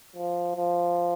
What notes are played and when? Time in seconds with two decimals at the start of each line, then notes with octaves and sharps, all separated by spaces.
0.16 F3
0.56 F3